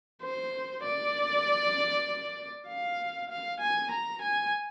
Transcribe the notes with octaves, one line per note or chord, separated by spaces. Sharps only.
C5
D5
F5
F5
G#5
A#5
G#5